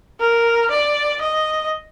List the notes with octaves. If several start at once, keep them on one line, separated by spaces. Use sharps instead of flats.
A#4
D5
D#5